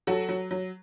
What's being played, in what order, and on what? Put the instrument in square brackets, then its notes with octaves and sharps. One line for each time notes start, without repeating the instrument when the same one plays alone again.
[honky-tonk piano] F#3 F#4 A4
F#3
F#3